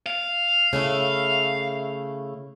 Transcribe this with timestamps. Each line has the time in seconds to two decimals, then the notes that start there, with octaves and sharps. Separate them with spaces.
0.06 F5
0.73 C#3 A3 E4